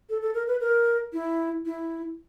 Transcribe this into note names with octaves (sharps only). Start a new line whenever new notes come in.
A4
A4
A#4
B4
A#4
E4
E4